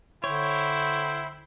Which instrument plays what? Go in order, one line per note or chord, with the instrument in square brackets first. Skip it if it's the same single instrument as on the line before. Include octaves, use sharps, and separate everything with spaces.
[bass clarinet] D3 [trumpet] E4 [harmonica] C5 G5 [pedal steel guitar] C#5